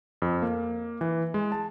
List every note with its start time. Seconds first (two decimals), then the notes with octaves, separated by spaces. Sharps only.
0.22 F2
0.42 A#3
1.01 E3
1.34 G#3
1.52 A5